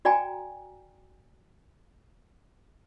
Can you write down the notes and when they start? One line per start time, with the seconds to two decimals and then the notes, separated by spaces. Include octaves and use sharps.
0.05 F#4 D5 G5 G#5 A#5